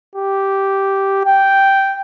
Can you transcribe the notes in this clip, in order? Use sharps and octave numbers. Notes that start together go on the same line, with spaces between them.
G4
G5